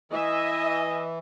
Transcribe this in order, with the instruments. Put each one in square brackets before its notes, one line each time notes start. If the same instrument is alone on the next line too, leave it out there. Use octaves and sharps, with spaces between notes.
[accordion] E3 [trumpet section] D#5 [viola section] E5 G#5